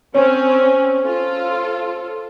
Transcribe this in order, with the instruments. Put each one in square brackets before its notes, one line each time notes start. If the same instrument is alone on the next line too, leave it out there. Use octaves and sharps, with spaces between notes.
[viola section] C4 C#4 [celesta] C5 C#5
[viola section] F4 A4